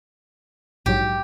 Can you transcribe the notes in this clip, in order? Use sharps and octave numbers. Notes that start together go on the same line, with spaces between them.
A#1 G#2 F#3 G4